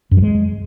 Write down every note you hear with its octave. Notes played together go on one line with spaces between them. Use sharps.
F#2
F#3
G#3